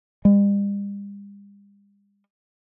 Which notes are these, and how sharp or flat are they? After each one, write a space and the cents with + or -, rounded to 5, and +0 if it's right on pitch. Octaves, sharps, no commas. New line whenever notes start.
G3 +45